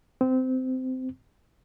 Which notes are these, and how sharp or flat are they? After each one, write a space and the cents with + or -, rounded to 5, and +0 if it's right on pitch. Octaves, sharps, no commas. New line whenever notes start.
C4 -20